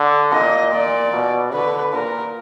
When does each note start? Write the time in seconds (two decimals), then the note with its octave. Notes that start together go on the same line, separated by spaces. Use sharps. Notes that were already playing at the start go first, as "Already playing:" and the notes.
Already playing: D3
0.32 A#2 D#5
0.73 A#2 D5
1.13 B2
1.53 D3 B4
1.94 A#2 A#4